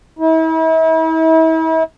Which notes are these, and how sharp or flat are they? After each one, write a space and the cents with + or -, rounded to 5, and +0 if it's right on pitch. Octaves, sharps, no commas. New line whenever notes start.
E4 -40